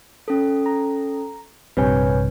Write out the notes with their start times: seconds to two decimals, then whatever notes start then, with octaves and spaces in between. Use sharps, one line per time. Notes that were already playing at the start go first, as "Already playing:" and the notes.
0.28 C#4 A4
0.66 A#5
1.77 A#1 G2 C3 B4 C#5 G#5